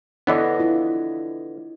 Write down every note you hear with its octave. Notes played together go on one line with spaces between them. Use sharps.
D3 E3 B3 D4 C#5 D#5
E4 F4